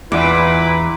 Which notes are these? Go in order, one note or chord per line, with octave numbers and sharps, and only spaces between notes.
E2 A#2 E4 B4 D6